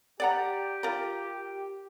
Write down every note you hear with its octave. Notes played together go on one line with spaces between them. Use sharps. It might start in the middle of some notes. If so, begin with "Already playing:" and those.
G4 D5 F#5 A#5
F4 A#4